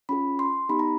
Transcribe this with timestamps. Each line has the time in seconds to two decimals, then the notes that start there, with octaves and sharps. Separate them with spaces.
0.09 C#4 F4 G#4 B5
0.39 C6
0.69 B3 D#4 G4 B5
0.79 A#5